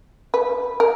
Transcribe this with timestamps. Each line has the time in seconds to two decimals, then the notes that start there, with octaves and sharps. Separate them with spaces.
0.34 B4
0.80 A#4